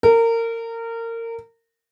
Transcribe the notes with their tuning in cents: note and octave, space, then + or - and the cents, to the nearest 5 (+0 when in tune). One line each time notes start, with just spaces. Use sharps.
A#4 -25